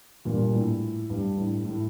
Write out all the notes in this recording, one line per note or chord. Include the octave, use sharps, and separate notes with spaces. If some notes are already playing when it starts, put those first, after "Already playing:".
G2 A#2
A2
G2
A2
A2